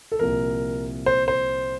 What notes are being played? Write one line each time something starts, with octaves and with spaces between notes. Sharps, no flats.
A4
C2 A#2 F3 A#4
C5
C5